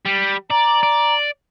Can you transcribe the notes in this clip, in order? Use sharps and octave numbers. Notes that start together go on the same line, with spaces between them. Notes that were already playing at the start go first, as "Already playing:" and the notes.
G3
D5 A#5
D5